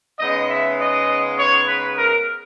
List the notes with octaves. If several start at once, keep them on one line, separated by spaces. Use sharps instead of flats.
C#3 G#3 B3 D#4 D#5
E5
D#5
C#5
B4
A#4